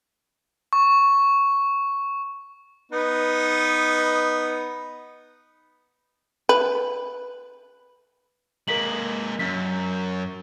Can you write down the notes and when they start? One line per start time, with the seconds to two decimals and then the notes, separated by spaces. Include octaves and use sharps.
0.73 C#6
2.92 B3 D#4 B4
6.49 B4
8.68 G#3 A#3 A#4 B6 F#7
9.39 F#2 B6